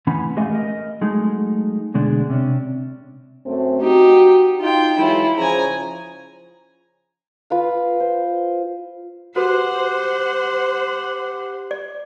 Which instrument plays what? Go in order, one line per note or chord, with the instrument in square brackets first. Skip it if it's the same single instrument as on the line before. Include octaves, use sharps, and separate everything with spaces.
[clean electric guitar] A2 E3 C#4 F#5 B5
G#3 A3 G4 D#5 F5 G#5
A#4 D#5
F#3 G#3 A3 D#4
D2 B2 G#3 D4
C3 C#4 D4
[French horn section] F#2 A3 C4
[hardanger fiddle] D#4 G4 [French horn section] F#4
[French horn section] D#4 [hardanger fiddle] F4 G5
[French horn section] E3 F#3 G#3 [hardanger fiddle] E4 F4
[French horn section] C#3 F3 [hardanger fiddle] G#5 A#5
[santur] F4 B4 F5
C5
[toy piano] F#4 A4 B4 [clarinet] G4 [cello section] C5 [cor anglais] F#5
[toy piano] D5